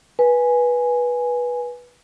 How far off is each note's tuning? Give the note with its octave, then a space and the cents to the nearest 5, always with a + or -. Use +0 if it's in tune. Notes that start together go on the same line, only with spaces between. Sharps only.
B4 -15 G#5 +0